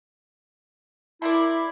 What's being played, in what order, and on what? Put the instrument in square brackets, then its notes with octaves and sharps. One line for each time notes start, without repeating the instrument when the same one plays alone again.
[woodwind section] E4 [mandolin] A#4 D5 C6